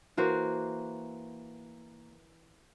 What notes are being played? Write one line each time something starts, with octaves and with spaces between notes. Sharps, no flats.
E3 A#3 F#4 C5